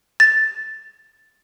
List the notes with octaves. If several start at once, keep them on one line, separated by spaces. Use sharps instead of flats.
A6